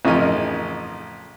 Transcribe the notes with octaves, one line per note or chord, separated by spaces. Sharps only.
A1 F2 C#3 D#4 A#4 G#5